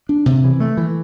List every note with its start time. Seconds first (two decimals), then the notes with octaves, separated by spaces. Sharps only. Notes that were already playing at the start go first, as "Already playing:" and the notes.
0.09 D4
0.26 C3
0.44 E3
0.60 A3
0.77 E3